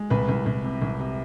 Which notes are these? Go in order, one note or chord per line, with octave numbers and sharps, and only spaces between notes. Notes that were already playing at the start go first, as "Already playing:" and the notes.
Already playing: G#3
C2 B4
C2
C2
C3
C2
C3